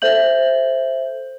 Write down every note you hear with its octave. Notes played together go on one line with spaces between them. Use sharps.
A4 C5 E5 G6 F#7